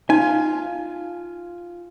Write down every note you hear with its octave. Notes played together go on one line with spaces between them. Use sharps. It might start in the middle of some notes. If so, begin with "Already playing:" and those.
D#4 F4 G#5